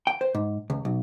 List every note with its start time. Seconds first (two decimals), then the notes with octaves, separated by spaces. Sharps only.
0.07 G5
0.21 C5
0.35 G#2
0.70 C#2
0.85 B1